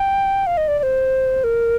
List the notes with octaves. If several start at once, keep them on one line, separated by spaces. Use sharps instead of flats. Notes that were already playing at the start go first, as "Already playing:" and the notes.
Already playing: G5
F5
D#5
D5
D5
C5
A#4